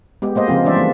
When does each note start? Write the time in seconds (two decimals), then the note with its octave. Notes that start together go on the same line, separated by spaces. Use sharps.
0.22 G#3 B3 G4
0.35 G#3 A#3 C5 D#5
0.48 C#3 F3 C4 F4
0.65 E3 G3 D4 C5 D5 E5
0.76 A3 A#3